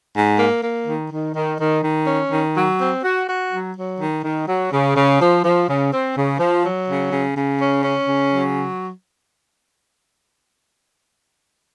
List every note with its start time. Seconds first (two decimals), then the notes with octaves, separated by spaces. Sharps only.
0.14 G#2
0.38 A#3
0.62 A#3
0.86 D#3
1.11 D#3
1.34 D#3
1.58 D#3
1.83 D#3
2.06 C#4
2.30 D#3
2.54 F#3
2.78 C4
3.03 F#4
3.27 F#4
3.51 F#3
3.75 F#3
3.99 D#3
4.23 D#3
4.47 F#3
4.71 C#3
4.96 C#3
5.20 F3
5.44 F3
5.67 C#3
5.92 C4
6.16 C#3
6.39 F3
6.64 F#3
6.88 C#3
7.12 C#3
7.36 C#3
7.60 C#4
7.84 C#4
8.08 C#3
8.31 F#3